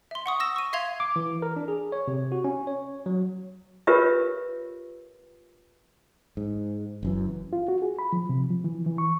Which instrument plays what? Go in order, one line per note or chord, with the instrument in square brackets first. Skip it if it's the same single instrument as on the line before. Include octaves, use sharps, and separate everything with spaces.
[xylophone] E5 C6
F#5 C#6 D#6
E6 A#6 E7
C#6 D#7
E5 F5 C6 G#6 F7
[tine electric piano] D6
E3
A#4
D4
G#4
C#5
C3
F#4
C#4
C#5
F#3
[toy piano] F4 G4 A#4 B4 C#5 E5
[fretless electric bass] G#2
F#1 F#2 E3
[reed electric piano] F4
F#4
G#4
B5
F3
C3
F3
E3
E3
C#6